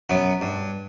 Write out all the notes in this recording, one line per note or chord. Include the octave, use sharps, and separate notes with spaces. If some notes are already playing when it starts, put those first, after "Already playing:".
F#2 B3
G2